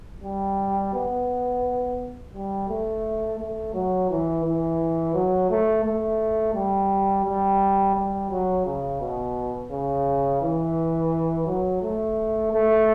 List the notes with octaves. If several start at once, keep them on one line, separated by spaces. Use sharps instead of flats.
G3
B3
G3
A3
A3
F#3
E3
E3
F#3
A3
A3
G3
G3
G3
F#3
C#3
B2
C#3
E3
F#3
A3
A3